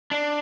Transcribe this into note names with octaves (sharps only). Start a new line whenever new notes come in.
D4